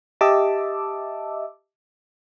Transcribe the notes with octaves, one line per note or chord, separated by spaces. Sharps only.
G4 D#5 E5 A5 D6 E6